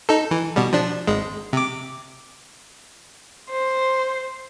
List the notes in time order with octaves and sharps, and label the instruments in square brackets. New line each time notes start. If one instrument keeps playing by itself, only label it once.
[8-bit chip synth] D#4 A4
E3
B2 G3
F3 D4
G#1 G#3
C3 D6
[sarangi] C5